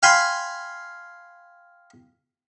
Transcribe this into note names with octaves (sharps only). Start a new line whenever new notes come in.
F5 G5 G#5 B5 C6